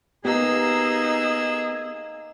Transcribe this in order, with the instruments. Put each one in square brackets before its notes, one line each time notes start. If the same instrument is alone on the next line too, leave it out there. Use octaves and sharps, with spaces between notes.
[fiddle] A#3 E6 [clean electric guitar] B3 G4 [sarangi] D#4 [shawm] G#4